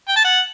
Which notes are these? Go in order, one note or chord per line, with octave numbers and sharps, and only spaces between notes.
G5
A5
F#5